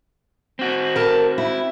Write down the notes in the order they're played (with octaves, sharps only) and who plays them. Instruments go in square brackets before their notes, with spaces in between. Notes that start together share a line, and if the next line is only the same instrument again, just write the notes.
[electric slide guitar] C4 F#4
[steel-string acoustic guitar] A#4 A5
E4